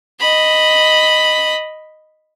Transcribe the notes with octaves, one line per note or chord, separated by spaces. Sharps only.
D#5 B5